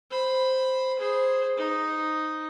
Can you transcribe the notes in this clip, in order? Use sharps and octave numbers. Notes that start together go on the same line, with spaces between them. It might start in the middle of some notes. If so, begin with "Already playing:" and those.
C5 B5
G#4 C5
D#4